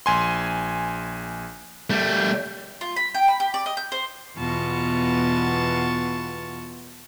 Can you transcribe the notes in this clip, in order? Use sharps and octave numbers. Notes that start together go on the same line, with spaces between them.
A#1 G#5 C6
G3 A3
F4
B5
G5
B5
G4
D5
D#5
G6
C5
E2 B2 B3 F4 A5 C#6